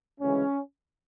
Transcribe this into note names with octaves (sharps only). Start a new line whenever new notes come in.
D2 C#3 E3 G#3 C#4